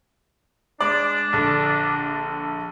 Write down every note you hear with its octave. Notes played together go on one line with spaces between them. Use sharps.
G#3 D4 D5
A#1 D3